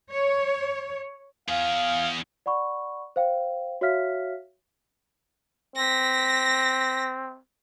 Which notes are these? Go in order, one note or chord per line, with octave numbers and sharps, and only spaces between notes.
C#5
E2 G#4 F5
D5 F#5 B5 C#6
C5 F5 G5
F#4 C#5 E5 F5 F6 B6
C4 A#6 B6